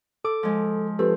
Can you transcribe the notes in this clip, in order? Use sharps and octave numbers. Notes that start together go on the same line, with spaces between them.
A4 D6
F3 G#3
F3 C4 G4 A4 B4